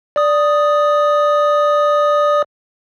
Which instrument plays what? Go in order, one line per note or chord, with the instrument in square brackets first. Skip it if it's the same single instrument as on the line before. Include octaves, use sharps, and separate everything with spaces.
[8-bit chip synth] D5 D#6